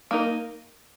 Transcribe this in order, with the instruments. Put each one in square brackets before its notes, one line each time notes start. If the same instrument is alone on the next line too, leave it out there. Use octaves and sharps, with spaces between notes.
[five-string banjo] A#3 D#4 A#4